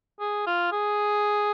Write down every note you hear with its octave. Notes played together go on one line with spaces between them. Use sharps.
G#4
F4
G#4